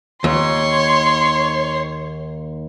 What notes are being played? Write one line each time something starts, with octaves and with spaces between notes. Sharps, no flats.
D#2 C#5 C6